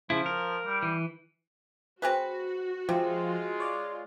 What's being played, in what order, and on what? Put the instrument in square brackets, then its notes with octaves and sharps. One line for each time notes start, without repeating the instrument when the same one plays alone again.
[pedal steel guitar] C#3 E4 [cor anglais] F3
[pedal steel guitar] A#4
[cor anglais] G3
[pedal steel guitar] E3
[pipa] C4 G#4 B4 [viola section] F#4
[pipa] C3 [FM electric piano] F3 [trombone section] G#3 F4
[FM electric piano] C#5 D5